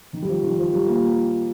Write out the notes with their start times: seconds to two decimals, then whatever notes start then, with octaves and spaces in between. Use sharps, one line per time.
0.13 D#3
0.22 G3
0.29 F3
0.43 D#3
0.59 F3
0.73 G3
0.88 A#3